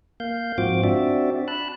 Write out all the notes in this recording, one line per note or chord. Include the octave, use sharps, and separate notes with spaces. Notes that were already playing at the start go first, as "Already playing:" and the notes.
A#3 F5 G6
G#2 F3 C4 F4 F#4 D6
C4 D4 F#4 D5 E5
A5 B5 F#6